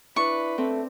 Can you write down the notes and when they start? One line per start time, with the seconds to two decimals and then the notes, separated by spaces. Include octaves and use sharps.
0.16 D4 E4 B4 C#6
0.58 A3 C4